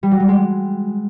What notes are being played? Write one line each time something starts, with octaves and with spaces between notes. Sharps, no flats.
G3
F#3
G3
G#3